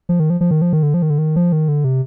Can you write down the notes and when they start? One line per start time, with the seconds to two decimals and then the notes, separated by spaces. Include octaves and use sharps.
0.09 F3
0.20 D#3
0.30 F3
0.41 F3
0.51 D#3
0.62 F3
0.73 D#3
0.83 D3
0.94 F3
1.02 D#3
1.10 D3
1.18 D#3
1.36 F3
1.52 D#3
1.68 D3
1.84 C3